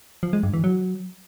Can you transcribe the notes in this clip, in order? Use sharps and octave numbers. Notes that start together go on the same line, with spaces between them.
F3
G#3
G2
E3
F#3